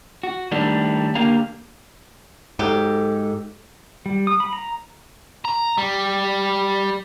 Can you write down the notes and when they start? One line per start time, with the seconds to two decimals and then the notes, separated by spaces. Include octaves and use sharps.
0.23 F#4
0.52 D#3 G3 A3 D4 E4
1.15 D3 A#3 G4 F5 A#5
2.59 G#2 F#3 G4 A4
4.06 G3
4.27 D#6
4.40 B5
4.53 A#5
5.45 A#5
5.78 G3